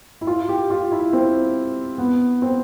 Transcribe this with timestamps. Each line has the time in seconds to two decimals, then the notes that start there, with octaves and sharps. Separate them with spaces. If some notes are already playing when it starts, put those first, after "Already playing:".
0.21 E4
0.27 F4
0.49 G4
0.70 F4
0.92 E4
1.13 C4
1.98 B3
2.42 C4